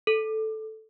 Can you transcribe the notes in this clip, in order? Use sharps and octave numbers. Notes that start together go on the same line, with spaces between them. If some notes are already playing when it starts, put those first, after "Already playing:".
A4